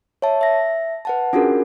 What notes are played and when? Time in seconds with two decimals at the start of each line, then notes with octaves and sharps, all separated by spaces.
0.22 C#5 E5 A5
0.41 E5 A#6
1.05 B4 F#5 A5
1.33 C#4 D4 F4 F#4 G#4 A#4